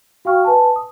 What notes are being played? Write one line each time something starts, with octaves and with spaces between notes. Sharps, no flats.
F#4 F5 G5 C#6 F6
B4 G#5 A5
D#6